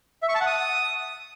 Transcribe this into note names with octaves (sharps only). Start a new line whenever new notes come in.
E5
C#6
A5
F#5
D#6